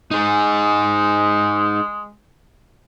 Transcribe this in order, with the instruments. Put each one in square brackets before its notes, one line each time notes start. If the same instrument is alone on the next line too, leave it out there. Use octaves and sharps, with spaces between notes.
[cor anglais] G#3 [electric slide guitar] D#4 G#4